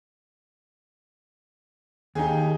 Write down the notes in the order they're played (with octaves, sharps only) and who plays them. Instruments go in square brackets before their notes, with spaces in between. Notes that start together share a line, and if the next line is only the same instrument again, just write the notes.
[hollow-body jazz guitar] D#2 [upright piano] D#4 G4 G#4